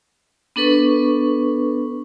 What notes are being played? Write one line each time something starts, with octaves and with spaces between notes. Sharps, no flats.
B3 D4 A4 B4 C#6